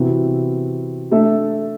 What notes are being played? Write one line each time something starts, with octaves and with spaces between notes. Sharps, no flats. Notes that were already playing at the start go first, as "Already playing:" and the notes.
Already playing: C3 E3 B3 F#4
A3 D4 A4 E5